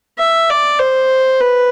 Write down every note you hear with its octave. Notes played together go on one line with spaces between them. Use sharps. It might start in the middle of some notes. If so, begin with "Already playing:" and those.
E5
D5
C5
B4